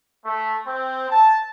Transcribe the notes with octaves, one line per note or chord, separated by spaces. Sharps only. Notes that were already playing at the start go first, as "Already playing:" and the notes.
A3
C4
A5